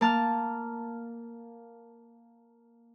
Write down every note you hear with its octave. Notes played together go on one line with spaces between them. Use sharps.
A#3 A5 F6